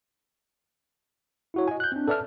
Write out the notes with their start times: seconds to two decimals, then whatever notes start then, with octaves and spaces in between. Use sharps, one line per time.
1.54 E4 F#4 C#5
1.68 D#5 G#5
1.80 F#6 G6
1.92 C4 D4
2.08 A4 B4 D5 E5 A5 F6